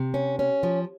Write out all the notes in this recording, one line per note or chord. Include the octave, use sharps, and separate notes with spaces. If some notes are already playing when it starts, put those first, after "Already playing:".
Already playing: C3
C#4
C#4
F3